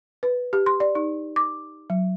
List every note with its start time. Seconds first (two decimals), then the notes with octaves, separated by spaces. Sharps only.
0.23 B4
0.53 G4
0.66 C6
0.80 D5
0.95 D#4
1.36 D6
1.90 F#3